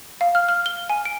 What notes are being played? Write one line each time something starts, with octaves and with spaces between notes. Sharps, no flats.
F5
F6
F6
G7
G#5
D7